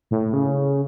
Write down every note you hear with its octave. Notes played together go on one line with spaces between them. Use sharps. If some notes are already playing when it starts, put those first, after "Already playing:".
A2
C#3